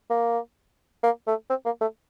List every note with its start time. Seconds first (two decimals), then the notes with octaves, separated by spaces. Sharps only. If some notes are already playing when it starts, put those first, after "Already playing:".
0.10 A#3
1.03 A#3
1.27 A3
1.50 C4
1.65 A#3
1.81 A3